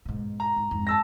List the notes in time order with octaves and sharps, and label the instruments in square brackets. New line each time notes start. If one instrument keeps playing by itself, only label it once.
[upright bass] G#2 B2
[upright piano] A#5
[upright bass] G#2
F2 G#2
[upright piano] A5 E6 A#6